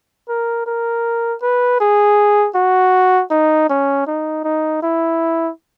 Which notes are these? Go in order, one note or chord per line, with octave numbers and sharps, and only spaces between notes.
A#4
A#4
B4
G#4
F#4
D#4
C#4
D#4
D#4
E4